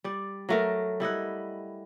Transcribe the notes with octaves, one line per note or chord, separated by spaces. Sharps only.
G3 D5
F#3 A3 A#4
G3 E4 D#5 F#5